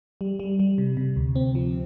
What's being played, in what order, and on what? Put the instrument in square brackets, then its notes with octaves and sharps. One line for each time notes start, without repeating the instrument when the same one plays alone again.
[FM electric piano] G3
G3
G3
C3
C3
D2
C4
F3